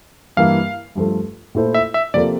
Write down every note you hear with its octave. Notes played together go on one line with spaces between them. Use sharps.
G2 E3 A#3 F5
G2 F3 A3
A#2 A3 E4 A4 C5
E5
E5
C3 F3 A#3 F4 A4 D5